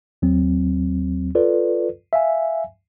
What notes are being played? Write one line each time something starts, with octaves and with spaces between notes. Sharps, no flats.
D#2 F#3 C4
F4 A4 B4 D5
E5 F5 G#5